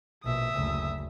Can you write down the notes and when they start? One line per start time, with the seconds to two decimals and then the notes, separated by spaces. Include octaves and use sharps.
0.24 A#1 B2 E5 D#6
0.54 F#1 D2